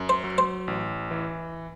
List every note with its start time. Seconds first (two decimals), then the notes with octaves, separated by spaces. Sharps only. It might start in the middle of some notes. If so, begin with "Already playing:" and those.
Already playing: F#2
0.09 C5
0.24 F#3
0.38 C5
0.68 A1
1.11 E3